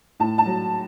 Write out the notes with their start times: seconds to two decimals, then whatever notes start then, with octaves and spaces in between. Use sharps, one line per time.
0.20 A2 A5
0.38 A5
0.46 F#3